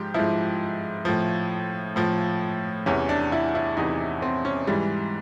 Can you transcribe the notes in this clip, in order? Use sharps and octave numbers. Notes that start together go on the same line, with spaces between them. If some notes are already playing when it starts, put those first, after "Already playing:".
Already playing: G#2 F3 G4
G#2 F3 E4
A2 F3
A2 F3
E2 C3 E3 C#4
D4
E4
E4
E2 C3 E3 D#4
C4
C#4
G#2 E3 G3